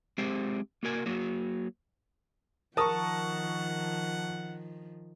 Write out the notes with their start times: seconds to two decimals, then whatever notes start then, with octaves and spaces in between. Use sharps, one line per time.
0.18 G#3 C4 G4 C5 E5
0.83 A#3 F#4 A#4 G#5
1.06 F#3 A#3 F#4
2.77 D#3 F3 A#4 F#5 A5 C#6 D#6